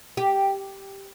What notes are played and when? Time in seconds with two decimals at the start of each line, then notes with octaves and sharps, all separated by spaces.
0.17 G4